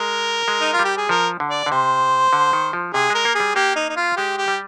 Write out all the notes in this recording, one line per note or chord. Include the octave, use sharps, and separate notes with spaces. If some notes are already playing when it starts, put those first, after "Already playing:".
Already playing: G#3 A#4
G#3
D#4
F4
G3
G4
G#4
F3 A#4
D3
D5
D3
C3 C5
D3
D#3
F3
C3 G#4
G#3 A#4
A#3
G#4
G3
A#3 G4
D#4
D#4
F4
G#3 G4
G4
G3